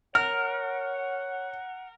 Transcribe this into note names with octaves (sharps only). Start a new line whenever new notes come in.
A#4 C#5 F#5 F6